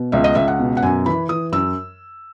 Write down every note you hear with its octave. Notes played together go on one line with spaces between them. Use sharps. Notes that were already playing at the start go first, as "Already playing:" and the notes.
Already playing: B2
C#2 E5
D#5
C#2 E5
F#5
B2
F#5
F#2 G#5
E3 B5
E3 D#6
F#2 E6